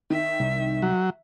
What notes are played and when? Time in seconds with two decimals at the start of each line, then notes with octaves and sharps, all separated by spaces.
0.10 D#3 E5
0.40 C2
0.82 F#3